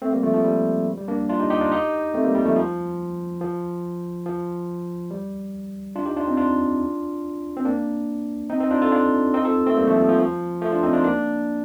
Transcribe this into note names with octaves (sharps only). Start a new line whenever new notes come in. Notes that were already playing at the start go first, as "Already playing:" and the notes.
A3 C4
G3 A#3
F3 A3
F3 A3
G3
G3
A#3 D4
D4 F4
D#4 G4
D#4 G4
D4 F4
D#4 G4
A3 C4
G3 A#3
G3
F3 A3
F3
F3
F3
G3
D4 F4
D#4 G4
D4 F4
C4 D#4
D4 F4
C4
A#3 D4
C4 D#4
C4 D#4
D4 F4
F4 A4
D4 F4
C4 D#4
F4 A4
A3 C4
G3 A#3
F3 A3
F3
F3
F3
F3 A3
D4 F4
C4 D#4
D4 F4
A#3 D4